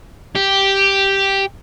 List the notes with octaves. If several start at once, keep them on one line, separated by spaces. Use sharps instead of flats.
G4